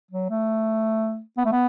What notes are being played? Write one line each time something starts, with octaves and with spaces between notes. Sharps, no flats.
F#3
A3
B3
A3
B3